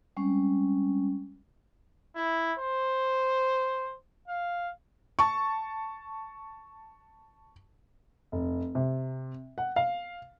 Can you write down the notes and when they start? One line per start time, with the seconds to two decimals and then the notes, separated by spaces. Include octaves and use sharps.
0.17 G3 G#3 C4 C#4
2.16 E4
2.59 C5
4.28 F5
5.19 A5 C#6
8.32 F1
8.75 C3
9.58 F#5
9.76 F5